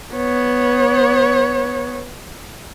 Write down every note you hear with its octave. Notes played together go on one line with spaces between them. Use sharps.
B3 C#5